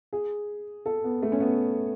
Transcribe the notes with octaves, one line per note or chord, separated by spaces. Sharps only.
G#4
A4
B3
A3
C#4
B3